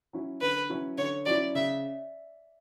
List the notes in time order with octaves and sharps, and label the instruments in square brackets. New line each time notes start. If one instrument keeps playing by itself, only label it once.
[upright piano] F#3 C#4 E4
[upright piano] D3 [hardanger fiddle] B4
[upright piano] F#3 C#4 E4
[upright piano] D3 [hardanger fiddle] C#5
[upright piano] F#3 C#4 E4 [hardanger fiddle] D5
[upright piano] C#3 [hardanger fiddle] E5